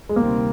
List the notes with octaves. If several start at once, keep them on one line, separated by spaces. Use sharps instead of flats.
G#3
D2 C3 D#3 G3 A#3 C4